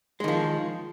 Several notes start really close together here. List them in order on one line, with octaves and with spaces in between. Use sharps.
G#3 D#3 F3